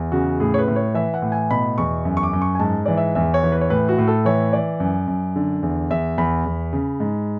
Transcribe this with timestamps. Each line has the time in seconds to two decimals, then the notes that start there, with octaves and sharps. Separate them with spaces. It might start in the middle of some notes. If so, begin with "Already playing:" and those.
Already playing: E2
0.12 C#3 F#4
0.40 A2 G#4
0.54 C#5
0.58 B4
0.68 A2
0.76 C#5
0.94 E3 E5
1.14 F#5
1.22 A2
1.32 G#5
1.51 B2 B5
1.78 E2 C#6
2.05 F#2
2.17 C#6
2.23 D6
2.33 F#2
2.42 C#6
2.55 G#5
2.60 G#2 A5
2.86 E3 D5
2.97 E5
3.15 E2 E5
3.34 C#5
3.43 E3
3.52 B4
3.61 C#5
3.70 A2 B4
3.89 F#4
3.98 A2
4.08 A4
4.25 E3 C#5
4.53 E3 D5
4.80 F#2
5.07 F#2
5.36 D3
5.63 E2
5.90 E2 E5
6.18 E2 B5
6.46 E2
6.73 C#3
7.00 G#2